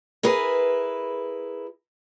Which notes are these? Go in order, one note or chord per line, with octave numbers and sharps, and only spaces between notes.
E4 G#4 A#4 B4